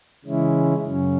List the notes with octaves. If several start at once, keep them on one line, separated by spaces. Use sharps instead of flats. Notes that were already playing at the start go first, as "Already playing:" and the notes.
C#3 E3 G#3 C#4 E4
F#2 C#3 F#3 C#4